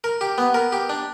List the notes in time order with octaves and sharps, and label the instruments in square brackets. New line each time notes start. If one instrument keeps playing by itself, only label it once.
[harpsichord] A#4
G4
B3
A#4
G4
D4